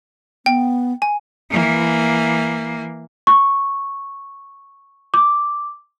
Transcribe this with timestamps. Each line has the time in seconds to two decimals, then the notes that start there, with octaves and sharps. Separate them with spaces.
0.46 B3 G5
1.02 G#5
1.51 E3 A#3
3.27 C#6
5.14 D6